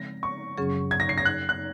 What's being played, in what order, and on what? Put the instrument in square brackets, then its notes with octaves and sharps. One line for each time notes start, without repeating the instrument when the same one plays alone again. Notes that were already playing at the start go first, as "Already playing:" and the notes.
Already playing: [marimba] C#3 F3 G#3 C4 [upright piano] A#6
[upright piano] C#6
[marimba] F#2 C#3 F#3 C#4 G#4
[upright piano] G#6
A#6
C7
A#6
F#6
F#6